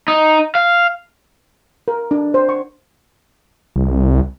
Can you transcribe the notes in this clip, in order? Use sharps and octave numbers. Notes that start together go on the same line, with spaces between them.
D#4
F5
A#4
D4
C5
C#6
C2